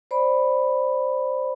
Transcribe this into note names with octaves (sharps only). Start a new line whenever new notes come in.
C5 D5 B5